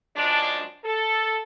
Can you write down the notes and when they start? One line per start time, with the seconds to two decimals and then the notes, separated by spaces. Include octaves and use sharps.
0.16 F#2 F3 G#3 D4
0.84 A4